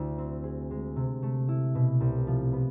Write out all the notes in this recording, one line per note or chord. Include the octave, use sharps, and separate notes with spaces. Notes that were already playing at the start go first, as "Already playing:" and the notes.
Already playing: D2 A3 E4
C4
G#4
G#3
C3
A3
E4
B2
C2
F3
B3